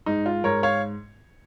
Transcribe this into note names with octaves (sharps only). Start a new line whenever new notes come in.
G#2 D#4
F4
G#2 A#4 C#5
C#5 F5